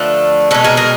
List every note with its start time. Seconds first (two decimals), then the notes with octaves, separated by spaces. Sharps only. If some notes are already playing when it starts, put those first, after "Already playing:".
Already playing: D3 F3 A3 A4 B4
0.51 B2 G#3 A4 B4
0.64 G#4 A#4
0.77 G#4 A#4